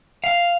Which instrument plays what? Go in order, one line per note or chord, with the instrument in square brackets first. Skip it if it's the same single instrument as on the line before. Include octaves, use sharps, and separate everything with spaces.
[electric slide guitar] F5